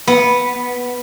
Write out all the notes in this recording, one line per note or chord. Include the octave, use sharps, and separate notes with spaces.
B3